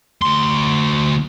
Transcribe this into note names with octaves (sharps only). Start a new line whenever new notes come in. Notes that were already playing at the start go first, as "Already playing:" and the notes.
D2 C6